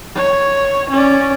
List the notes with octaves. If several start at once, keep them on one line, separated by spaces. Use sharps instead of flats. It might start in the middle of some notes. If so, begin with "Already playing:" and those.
C#5
C#4 D5